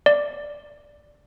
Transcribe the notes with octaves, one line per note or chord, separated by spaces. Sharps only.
D5